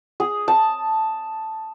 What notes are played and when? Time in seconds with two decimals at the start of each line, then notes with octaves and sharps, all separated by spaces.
0.20 G#4
0.48 A5